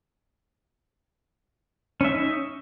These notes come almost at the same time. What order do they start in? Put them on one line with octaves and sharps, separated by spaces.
C#4 E5 D#4